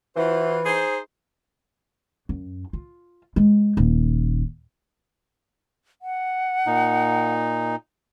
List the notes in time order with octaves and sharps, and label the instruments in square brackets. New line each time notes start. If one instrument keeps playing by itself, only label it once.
[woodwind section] E3 [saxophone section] F4 F#4 C5
[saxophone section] D#4 G#4 C5
[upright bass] F#2
F4
G#3
D#1
[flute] F#5
[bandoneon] A#2 D#4